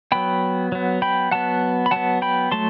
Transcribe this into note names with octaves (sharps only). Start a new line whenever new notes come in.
F#3 B3 G5 B5
F#3 B3
G5 B5
F#3 B3 F#5 A5
B5
F#3 B3 F#5 A5
G5 B5
F#3 A3 A5 C6